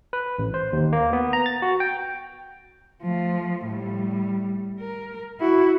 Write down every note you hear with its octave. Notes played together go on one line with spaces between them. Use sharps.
B4
A1
C5
D#2
A#3
B3
A#5
A6
F#4
G5
F3 A3
A2 G3
A#4
E4 F#4